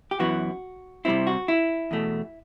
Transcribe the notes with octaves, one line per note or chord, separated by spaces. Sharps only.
G4
F#2 E3 B3 F#4
C3 G3 C4 E4
F#4
E4
E2 B2 A3